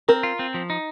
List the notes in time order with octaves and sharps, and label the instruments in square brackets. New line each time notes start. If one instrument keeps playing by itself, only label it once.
[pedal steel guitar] C4 [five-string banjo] A#4
[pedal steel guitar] F4
C4
F3
D#4